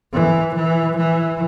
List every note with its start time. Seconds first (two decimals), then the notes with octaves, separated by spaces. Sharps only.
0.13 E3
0.55 E3
0.98 E3